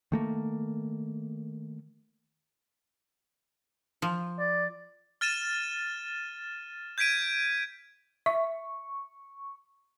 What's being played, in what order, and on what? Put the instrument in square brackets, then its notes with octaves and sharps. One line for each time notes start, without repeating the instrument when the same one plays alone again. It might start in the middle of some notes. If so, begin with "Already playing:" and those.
[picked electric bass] D#3 A3 A#3
[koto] F3
[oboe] D5
[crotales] F6 A6 D#7 E7
G6 G#6 B6 D7 D#7
[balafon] E5 [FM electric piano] C#6